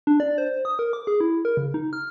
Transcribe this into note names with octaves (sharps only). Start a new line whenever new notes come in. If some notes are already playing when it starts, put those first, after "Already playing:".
D4
D5
C5
D#6
A#4
D6
G#4
E4
A#4
C#3
D#4
F6